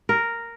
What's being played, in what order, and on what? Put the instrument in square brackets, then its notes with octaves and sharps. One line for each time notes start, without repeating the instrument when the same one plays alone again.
[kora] A#4